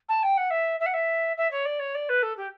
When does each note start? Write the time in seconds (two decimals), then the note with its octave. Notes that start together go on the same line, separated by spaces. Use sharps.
0.08 A5
0.22 G5
0.37 F#5
0.50 E5
0.79 E5
0.86 F#5
0.93 E5
1.37 E5
1.50 C#5
1.65 D5
1.79 C#5
1.94 D5
2.09 B4
2.22 A4
2.37 G4